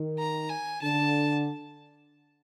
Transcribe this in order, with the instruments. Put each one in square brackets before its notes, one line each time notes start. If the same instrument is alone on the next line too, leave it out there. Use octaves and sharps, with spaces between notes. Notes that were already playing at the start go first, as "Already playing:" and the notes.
Already playing: [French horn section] D#3
[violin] A#5
G#5
[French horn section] D3 [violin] A5